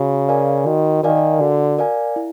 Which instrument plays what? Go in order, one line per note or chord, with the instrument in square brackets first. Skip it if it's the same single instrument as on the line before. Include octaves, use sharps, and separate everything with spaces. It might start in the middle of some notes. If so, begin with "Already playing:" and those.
Already playing: [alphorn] C#3 [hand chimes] F#4
[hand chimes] A#4 D5 F5 G#5
[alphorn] D#3 [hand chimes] F#4
[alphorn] D#3 [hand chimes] A#4 D5 F5 G#5
[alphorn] D3 [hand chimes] F#4
[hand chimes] A#4 D5 F5 G#5
E4